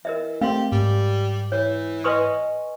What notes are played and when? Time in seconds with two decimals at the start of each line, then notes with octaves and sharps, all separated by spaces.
0.05 E3 A#4 D#5 E5
0.41 A3 C4 G4 F5 C6
0.72 G#2 G3
1.52 E3 C#5
2.04 B4 D#5 G#5 C6 C#6 D#6